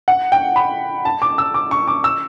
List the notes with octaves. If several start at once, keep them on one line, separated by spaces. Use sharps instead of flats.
F#5
G5
B5
A5
D6
E6
D6
C#6
D6
E6